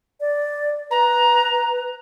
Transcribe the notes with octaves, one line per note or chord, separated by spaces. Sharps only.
D5
B4 A#5